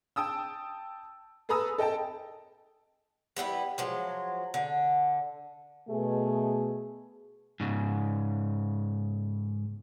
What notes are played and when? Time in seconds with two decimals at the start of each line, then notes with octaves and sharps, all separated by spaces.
0.16 G5 A5 D#6 E6
1.49 G#4 A4 B4 A#5 D#6 E6
1.78 A4 D#5 G5 A5
3.37 G3 B3 D#4 E4
3.78 F3 F#3 G#3
4.54 D3
5.89 B2 A3 G#4
7.60 G#2 C#3